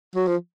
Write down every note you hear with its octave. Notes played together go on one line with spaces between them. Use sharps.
F#3
F3